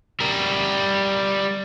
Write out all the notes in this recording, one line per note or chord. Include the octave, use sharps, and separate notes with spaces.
G3 A#4